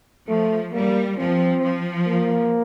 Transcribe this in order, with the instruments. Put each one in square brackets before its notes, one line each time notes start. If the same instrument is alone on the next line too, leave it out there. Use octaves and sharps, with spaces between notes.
[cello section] F3 [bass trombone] A3
[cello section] G3 [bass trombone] A#3
[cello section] F3 [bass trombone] C4
[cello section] F3
[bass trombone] A#3